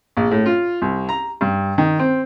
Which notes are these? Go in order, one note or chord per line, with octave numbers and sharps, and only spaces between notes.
A#1
A2
F4
C2
A#5
G2
D#3
C4